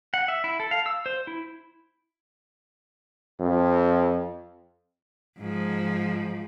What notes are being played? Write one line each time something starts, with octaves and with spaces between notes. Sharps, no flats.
F#5
E5
E4
A4
F5
E6
C5
E4
F2
G#2 F3